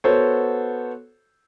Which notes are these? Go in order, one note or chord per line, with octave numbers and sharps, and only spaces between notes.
B3 F#4 A4 C5 C#5